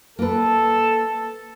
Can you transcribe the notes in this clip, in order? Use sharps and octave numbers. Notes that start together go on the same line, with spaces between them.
A#3 A4 B4